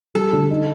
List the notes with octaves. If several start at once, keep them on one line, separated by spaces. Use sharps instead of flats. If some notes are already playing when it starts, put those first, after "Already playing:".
G3 A4
D3
D#4